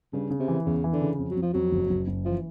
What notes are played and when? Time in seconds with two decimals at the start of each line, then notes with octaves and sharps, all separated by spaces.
0.13 G2 C#3
0.30 C#3
0.39 C3
0.48 E3
0.66 E2 C#3
0.84 E3
0.93 D3
1.01 C#3
1.19 F2
1.31 F#3
1.36 F2
1.42 F3
1.53 F2 F#3
1.72 F#1
1.90 F#1
2.08 F#1
2.25 E3 F3